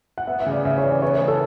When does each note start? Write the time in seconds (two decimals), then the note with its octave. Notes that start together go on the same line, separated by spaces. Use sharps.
0.18 F#5
0.27 B3 E5
0.40 E5
0.46 C#3
0.52 D5
0.65 C#3 E5
0.78 C#5
0.83 E3
0.90 D5
1.02 B3 C#5
1.15 B4
1.22 C#3
1.28 A4